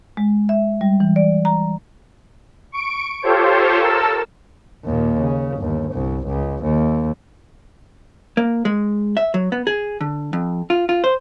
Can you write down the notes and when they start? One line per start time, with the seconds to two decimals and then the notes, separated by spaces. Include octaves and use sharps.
0.17 G#3
0.49 E5
0.81 G3
1.00 E3
1.16 D5
1.45 A#5
2.72 C#6 D7
3.22 F4 G4 A4 C5 C#5
3.81 A4 A#4 A5 E6
4.84 D#2 A#2
5.20 C#3
5.57 G1 D#2
5.92 C2
6.27 C#2
6.63 D#2
8.37 A#3
8.65 G#3
9.17 E5
9.34 F#3
9.52 B3
9.67 G#4
10.01 D3
10.33 F2
10.70 F4
10.89 F4
11.04 C5